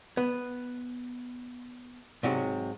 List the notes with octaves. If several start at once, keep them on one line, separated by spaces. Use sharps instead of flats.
B3
G#2 C3 F#3